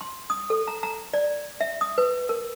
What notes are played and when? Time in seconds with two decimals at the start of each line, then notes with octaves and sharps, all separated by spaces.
0.01 C6
0.30 D#6
0.50 A4
0.67 A#5
0.83 A#5
1.14 D5
1.61 E5
1.81 D#6
1.98 B4
2.29 A#4